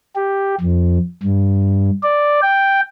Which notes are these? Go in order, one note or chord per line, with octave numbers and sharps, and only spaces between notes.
G4
F2
G2
D5
G5